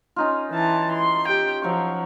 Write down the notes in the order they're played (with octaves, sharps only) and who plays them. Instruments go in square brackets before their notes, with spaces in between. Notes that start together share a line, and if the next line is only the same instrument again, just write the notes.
[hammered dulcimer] C#4 D#4 F4
[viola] E3 A5
C6
G4 G5
[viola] F3 [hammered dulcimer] F#3 F5 C#6